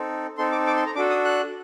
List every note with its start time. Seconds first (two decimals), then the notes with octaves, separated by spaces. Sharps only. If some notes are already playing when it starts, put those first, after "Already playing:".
Already playing: C4 D#4 A4
0.38 C4 D#4 A4 C6
0.52 D6
0.67 D6
0.76 C6
0.86 A#5
0.95 D4 F#4 A4 D6
1.10 D#6
1.24 F#6